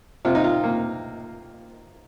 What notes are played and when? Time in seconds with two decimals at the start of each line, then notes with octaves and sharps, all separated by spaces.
0.25 C3 F4
0.35 D#4
0.44 F4
0.64 A#3